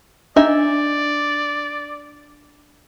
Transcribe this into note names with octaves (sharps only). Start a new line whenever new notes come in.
D4 D#4 D5 E5 G#5